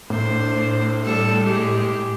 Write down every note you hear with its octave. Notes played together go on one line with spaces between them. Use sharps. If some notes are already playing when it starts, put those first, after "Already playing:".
A2 D4 C5
A2
G3 A4
G#3 G4